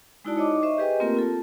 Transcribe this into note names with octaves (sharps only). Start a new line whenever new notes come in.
G#3 D#4 E4 F#4 D5 A5
D#4 C#5 D#5 D6
C5 D#5 E5 C#6
G4 G#4 B4 D#5 G5 G#5
A3 A#3 C4 F4 G4 A#4
F4 A4 A5